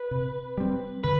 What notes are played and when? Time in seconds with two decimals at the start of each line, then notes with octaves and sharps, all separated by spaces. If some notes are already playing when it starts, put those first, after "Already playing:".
Already playing: B4
0.11 C3
0.58 G3 C4
1.04 D3 B4